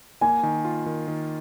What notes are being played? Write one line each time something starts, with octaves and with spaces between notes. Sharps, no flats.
A#3 G#5
D#3
F4
D#3
D#3